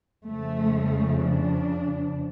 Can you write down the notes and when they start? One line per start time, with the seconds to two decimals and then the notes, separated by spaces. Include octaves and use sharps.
0.25 F2 C#3 F3 A3
1.22 D4